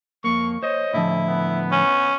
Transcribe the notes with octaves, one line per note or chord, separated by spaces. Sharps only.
F2 A#3 C#6
C5 C#5 D#5
A2 D3 F3 E4
B3
C#4